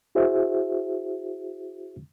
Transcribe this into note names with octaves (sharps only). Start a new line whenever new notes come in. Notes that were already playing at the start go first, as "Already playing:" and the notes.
E4 F#4 G#4 C5 E5